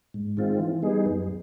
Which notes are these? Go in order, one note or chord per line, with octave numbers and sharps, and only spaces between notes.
G#2
D#3 G#3 C4 F4
E3
G3 B3 D#4 G#4
F#2